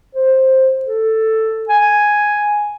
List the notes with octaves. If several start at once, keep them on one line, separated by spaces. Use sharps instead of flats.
C5
A4
G#5